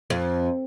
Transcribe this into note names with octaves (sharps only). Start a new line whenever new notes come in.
F2